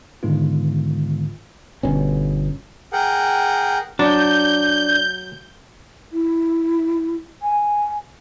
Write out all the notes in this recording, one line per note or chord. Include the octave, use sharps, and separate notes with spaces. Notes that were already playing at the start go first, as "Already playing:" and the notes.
G#2 D3 D#3 G#3 B3 F4
G1 B2 C#4
G#4 A#4 F#5 G5
F#3 D4 G6
E4
G#5